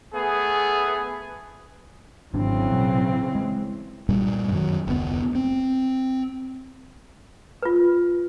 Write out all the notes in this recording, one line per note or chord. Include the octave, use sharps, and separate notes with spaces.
A3 B3 G#4
G#1 C#3 E3 F#3 C4 D4
A1 B2 F#3
G#3
G2 A#2 G3
F#2 D#3 F#3
F1 D2 A2 B3
C4
F4 B4